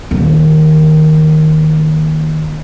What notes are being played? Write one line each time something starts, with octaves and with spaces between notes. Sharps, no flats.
D#2 A#2